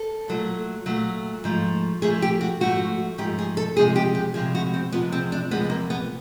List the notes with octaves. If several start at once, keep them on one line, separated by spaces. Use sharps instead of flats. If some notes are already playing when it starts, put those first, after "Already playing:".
Already playing: A4
A#2 F#3 A3
A#2 F#3 A3
G#2 F3 A3
G#2 F3 A3 G#4
G4
F#4
G#2 F3 A3 F#4
G#2 F3 A3 G4
G#4
A4
E2 C3 F3 G#3 G#4
G4
G4
E2 C3 F3 G#3 G#4
F#4
C4
E2 C3 F3 G#3 B3
C4
D4
E2 C3 F3 G#3 B3
A#3
B3